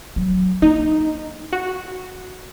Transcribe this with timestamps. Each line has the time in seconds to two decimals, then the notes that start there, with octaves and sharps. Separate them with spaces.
0.16 F#3
0.62 A#3 D#4
1.53 F#4